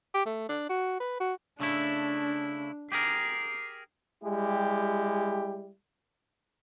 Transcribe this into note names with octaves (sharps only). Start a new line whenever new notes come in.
G4
A3
D4
F#4
B4
F#4
C#3 A3 D4 E4
G4 G#4 A#4 C7
G3 G#3 E4 G4